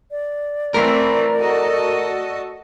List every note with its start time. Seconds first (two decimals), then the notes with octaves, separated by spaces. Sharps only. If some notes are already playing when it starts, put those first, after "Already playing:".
0.11 D5
0.74 E3 A3 C4 A#4
1.39 F#4 A4 D#5